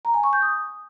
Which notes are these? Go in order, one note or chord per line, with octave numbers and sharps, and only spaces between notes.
A#5
G#5
C#6
G6
D#6